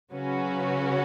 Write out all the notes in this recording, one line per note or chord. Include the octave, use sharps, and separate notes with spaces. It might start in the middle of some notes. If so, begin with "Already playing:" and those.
C#3 F#3 C#4 F#4 B4